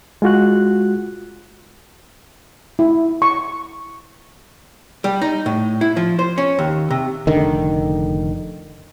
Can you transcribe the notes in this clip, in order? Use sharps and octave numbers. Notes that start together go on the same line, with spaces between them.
G#3 F4 F#4 F#6
E4
C#6
G3
D#4
A2
E4
F3
C5
C#4
D#2
C3
F1 D3 D#3